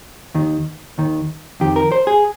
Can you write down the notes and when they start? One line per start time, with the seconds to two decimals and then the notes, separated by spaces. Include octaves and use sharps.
0.35 D#2 D#3
0.98 D#2 D#3
1.60 F2 D#3 G4
1.76 A#4
1.92 C5
2.07 G#4